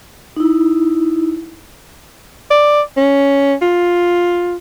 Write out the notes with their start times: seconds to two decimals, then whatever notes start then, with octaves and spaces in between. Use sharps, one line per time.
0.36 D#4 E4
2.51 D5
2.97 C#4
3.62 F4